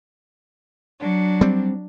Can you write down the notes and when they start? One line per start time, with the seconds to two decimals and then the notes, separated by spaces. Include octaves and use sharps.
1.01 F#3 D4
1.41 G3 C4